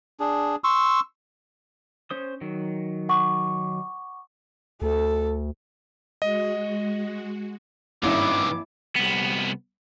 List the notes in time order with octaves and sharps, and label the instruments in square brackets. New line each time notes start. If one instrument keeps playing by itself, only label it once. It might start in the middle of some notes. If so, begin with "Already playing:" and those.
[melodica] D4 G#4
C6 C#6 E6
[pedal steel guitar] C#4 C5 D#6
D#3 F#3
[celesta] F#5 C#6 D6
[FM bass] D2 [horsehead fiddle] A4
[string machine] G#3 F#4 [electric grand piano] D#5
[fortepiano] G#1 G2 C#4 [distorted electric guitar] D#3 E3 [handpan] A#3 E4 [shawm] D6
[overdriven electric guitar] C2 B3